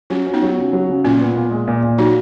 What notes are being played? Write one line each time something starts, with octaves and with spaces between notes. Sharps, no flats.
F#3 C#4 F4
C#4
B3 D#4
F#3
C#3
F#3
C#3
A#2 C#4 F4
B3
A#2
G#3
A#2
A#2
F#3 D#4 F#4